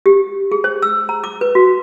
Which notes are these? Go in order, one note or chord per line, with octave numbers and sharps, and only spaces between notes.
G4
G#4
C5
E6
A#5
D6
B4
F#4